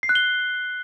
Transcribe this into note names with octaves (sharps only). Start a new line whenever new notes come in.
C7
F#6
G7